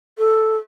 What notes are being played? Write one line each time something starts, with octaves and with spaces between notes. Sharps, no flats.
A4